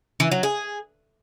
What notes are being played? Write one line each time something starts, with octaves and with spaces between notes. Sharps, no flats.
E3
F#3
G#4